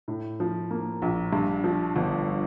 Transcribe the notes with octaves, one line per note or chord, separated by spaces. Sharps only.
A2
F3
A#3
A#1
G2
F3
G1